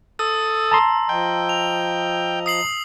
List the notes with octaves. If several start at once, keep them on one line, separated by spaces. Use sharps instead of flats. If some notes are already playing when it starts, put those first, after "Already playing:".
A4 D#6 E6
A5 A#5 C6
F3 D#5 G5
F7
D#6 C7 F#7